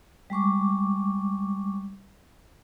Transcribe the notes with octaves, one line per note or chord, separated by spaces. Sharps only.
G3 G#3 C#6 D6